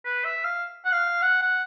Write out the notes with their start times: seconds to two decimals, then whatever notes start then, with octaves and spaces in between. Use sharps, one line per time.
0.05 B4
0.24 E5
0.45 F5
0.85 F#5
0.92 F5
1.22 F#5
1.42 F#5